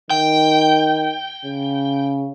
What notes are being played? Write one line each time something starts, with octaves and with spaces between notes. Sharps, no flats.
D#3 G5
C#3